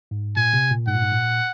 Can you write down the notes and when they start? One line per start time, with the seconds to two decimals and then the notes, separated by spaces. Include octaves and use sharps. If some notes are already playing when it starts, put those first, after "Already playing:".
0.11 G#2
0.37 A#2 G#5
0.53 C3
0.71 A#2
0.87 G#2 F#5
0.95 A#2
1.02 G#2
1.12 A#2